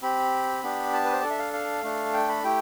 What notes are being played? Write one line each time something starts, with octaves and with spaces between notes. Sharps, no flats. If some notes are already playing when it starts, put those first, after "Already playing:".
C4 G4 B5
B3 D4 G4
A5
B4
C5
D4 A4 D5
E5
F5
F5
A3 D4 A4
G5
B5
A3 E4 G4 G5